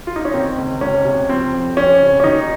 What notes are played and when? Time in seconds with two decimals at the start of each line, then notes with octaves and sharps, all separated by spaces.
0.07 F4
0.16 D#4
0.25 C#4
0.34 D#3 C4
0.58 C#2
0.81 C#2 C#4
1.05 C3
1.29 F3 C4
1.53 F2
1.77 F2 C#4
2.00 C#3
2.20 C#4
2.24 D#2 D#4